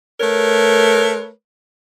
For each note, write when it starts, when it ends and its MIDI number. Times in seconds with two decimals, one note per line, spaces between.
0.20 1.31 57
0.20 1.31 70
0.20 1.31 71
0.20 1.31 73